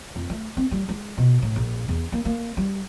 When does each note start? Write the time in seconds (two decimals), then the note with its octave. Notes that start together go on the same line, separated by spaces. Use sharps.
0.16 F2
0.30 A3
0.57 C4
0.71 G3
0.89 G#3
1.18 B2
1.42 A2
1.56 A#1
1.88 E2
2.12 A#3
2.25 A#3
2.57 G3